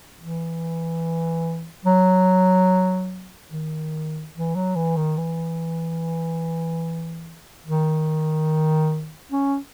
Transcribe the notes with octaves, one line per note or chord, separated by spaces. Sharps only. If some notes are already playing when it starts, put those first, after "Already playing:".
E3
F#3
D#3
E3
F#3
E3
D#3
E3
D#3
C#4